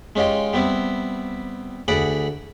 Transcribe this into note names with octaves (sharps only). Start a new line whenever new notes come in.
G#3 C#4 D#4 F4 G4
G3 B3 C4 E4
D2 G#4 D5 F#5 B5